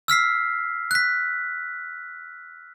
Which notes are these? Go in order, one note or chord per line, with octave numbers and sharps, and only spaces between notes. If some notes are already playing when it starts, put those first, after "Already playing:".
E6 F6 B6 C7
F#6 B6